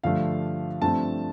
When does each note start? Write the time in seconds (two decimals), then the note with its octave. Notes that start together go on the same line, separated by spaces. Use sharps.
0.03 G2 D3 F3 A3 F5
0.82 G2 F3 A3 C4 A5